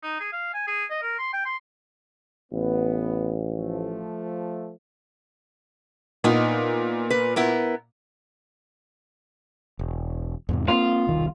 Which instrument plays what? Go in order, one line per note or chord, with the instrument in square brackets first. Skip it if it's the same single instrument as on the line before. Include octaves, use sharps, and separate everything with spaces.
[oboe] D#4
G#4
F5
G#5
G#4
D#5
A#4
C6
G5
C6
[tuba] A1 [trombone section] B3
[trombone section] F3 A3
[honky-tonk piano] A#2 [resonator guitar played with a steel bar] B3 D#4
[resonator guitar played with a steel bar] B4
B3 E4 A#4
[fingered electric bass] E1
E2 G#2 C3
[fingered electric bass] A#3 C4 [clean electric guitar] F4
[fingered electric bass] E1 C2 D#3